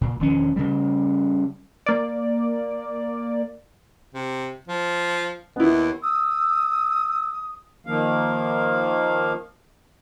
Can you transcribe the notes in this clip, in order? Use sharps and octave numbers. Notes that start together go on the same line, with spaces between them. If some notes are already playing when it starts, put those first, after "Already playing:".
A#2
E1 D#3 F3 C#4
C#3 G3
A#3 D5
C3
F3
D#2 B3 E4
D#6 E6
D#3 F3 A#3 F5